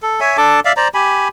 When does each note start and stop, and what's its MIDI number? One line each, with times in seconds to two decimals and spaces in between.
0.02 0.20 69
0.20 0.37 73
0.20 0.37 76
0.20 0.37 80
0.37 0.60 62
0.37 0.60 69
0.37 0.60 81
0.37 0.60 86
0.65 0.72 74
0.65 0.72 76
0.65 0.72 77
0.77 0.88 72
0.77 0.88 74
0.77 0.88 82
0.94 1.28 67
0.94 1.28 80
0.94 1.28 83